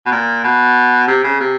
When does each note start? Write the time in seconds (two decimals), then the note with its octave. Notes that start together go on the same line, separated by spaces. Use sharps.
0.06 B2
0.12 A#2
0.44 B2
1.08 C3
1.24 C#3
1.40 C3